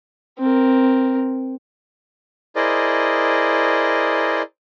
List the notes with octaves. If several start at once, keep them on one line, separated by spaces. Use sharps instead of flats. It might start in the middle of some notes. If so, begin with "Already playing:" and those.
C4 A#4
E4 G#4 A#4 C5 D5 D#5